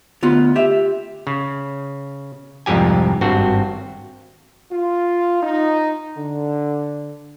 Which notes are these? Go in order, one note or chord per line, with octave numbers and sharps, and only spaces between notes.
D2 B3 F4
G4 E5
C#3
C2 F2 G#2 F3 G4 G#5
G#1 G2 C4 F#4
F4
D#4
D3